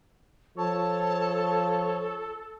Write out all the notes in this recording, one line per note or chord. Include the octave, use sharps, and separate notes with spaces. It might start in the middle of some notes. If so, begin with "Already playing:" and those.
F3 A4 C#5 A5